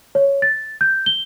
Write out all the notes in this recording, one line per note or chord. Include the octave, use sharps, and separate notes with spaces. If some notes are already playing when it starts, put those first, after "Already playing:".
C#5
A6
G6
G7